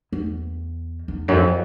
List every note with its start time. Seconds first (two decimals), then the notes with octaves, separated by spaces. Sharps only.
0.12 E2
1.08 E2
1.28 F#2
1.33 F2